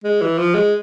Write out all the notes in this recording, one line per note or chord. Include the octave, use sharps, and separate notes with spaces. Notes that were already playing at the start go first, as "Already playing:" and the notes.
G#3
E3
F3
G#3